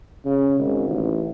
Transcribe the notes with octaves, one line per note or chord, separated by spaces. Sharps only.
C#3
G#1
A1